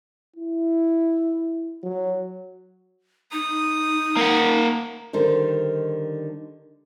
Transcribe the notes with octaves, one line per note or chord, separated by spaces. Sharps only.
E4
F#3
D#4 D#6
A#3 A#4 F#5
D3 D#3 G3 C5